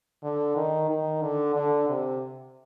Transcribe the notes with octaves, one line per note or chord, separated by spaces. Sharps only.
D3
D#3
D#3
D3
D3
C3